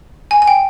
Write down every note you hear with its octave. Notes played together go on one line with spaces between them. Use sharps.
G#5
G#5
G5